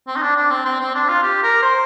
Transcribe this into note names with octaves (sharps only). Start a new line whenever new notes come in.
C4
D#4
D4
D4
C4
C4
C4
D4
F4
G4
A#4
C5